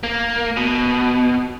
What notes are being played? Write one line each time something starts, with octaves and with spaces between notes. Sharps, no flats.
A#3
B2